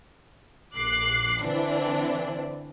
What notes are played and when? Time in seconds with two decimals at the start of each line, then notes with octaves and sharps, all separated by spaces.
0.77 A#1 D6 F#6 C7
1.44 D3 E3 C4 D4